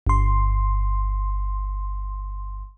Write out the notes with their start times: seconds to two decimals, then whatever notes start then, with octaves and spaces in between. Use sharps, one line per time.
0.07 G1 C6